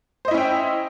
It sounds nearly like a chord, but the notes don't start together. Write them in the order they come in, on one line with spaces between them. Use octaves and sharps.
C5 D#5 E4 C#4 G5